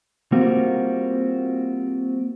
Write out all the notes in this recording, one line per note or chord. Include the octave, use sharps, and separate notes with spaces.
G3 A#3 C4 F4 F#4